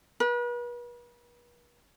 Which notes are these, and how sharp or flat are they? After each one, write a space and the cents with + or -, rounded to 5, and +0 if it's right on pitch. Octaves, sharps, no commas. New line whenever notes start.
B4 -40